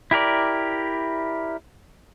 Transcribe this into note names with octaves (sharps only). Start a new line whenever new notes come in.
E4 G4 A#4 D5